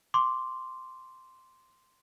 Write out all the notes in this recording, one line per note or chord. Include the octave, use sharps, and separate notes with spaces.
C6 D6